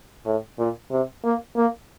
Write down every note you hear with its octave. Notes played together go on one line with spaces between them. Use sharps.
A2
A#2
C3
A#3
A#3